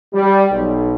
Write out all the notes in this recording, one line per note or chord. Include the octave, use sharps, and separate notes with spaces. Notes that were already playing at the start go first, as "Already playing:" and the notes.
G3
B1